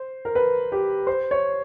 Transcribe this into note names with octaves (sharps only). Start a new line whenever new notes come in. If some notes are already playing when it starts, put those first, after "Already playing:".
Already playing: C5
A#4
B4
G4
C5
C#5